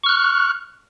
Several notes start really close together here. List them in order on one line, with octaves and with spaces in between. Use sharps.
C#6 F6 F#6